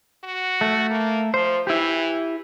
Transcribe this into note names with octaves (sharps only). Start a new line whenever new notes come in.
F#4
A3
A#3
F3 C5
E3 E4 G4